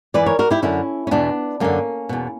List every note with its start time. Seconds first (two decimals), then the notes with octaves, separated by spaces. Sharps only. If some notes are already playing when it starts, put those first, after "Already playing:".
0.14 F#2 E3 B4 D5
0.26 A#4 C#5
0.39 F#4 A#4
0.50 E4 G4
0.62 F#2 D3 C#4 E4
1.07 C#4
1.11 E2 B2 B3 D4
1.60 F#2 D3 A#3 C#4
2.09 E2 B2